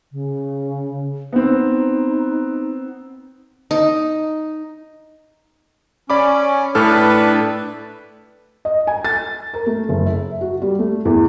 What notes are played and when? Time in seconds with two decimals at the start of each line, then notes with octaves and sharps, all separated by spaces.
0.12 C#3
1.33 B3 C4 D#4
3.71 D#4
6.10 C#4 D5 B5 D6
6.75 A2 D4 A4 B4 F6
8.65 D#5
8.87 G#5
9.05 A6
9.54 A#4
9.66 A3
9.89 F#1
10.06 E5
10.41 F#4
10.62 G3
10.79 A3
11.05 E2